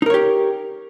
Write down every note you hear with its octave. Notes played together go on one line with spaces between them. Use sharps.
D#4 G4 A#4 C#5